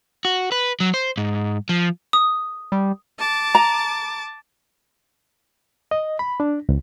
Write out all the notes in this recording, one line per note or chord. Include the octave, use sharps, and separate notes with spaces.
F#4
B4
F#3
C5
G#2
F3
D#6
G3
A5 D6
A#5
D#5
B5
D4
C#2